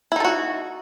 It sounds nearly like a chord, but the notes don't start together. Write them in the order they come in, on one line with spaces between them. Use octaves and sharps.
E4 D#4 A4 F#4